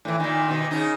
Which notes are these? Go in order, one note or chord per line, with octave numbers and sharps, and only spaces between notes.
A2 E3
A#2 D#3
B2 D#3
C#3 D#4